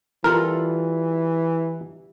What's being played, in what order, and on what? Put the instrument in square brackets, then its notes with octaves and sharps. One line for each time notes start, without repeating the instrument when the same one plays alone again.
[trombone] E3 [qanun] G3 F4 A4 [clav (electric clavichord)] A#4